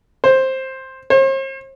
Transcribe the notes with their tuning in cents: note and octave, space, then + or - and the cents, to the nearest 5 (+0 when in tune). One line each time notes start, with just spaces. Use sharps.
C5 +10
C5 +45